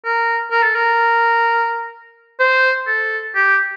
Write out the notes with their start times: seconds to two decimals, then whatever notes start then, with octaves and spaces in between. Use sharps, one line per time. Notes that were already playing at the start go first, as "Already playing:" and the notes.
0.04 A#4
0.51 A#4
0.63 A4
0.75 A#4
2.40 C5
2.87 A4
3.35 G4